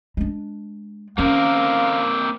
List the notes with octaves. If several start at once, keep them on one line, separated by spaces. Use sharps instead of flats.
G#3 D4
D#3 A#3 C4 C#4 A#4 F5